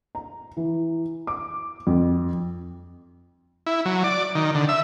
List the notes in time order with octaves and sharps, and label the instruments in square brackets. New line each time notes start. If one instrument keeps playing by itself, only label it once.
[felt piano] A#5
E3
D6
F2
[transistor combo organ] E4
F#3
D5
D#3
D3
E5